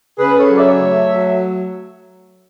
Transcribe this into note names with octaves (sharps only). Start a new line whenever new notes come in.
C#3 G#4 B4
A4 C#5
F#3
D5
C#5 E5
A3
F#3